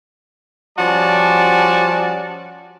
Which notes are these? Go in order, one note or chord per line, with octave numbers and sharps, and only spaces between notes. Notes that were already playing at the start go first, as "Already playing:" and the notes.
F3 G3 C#4 F#4 D5 A5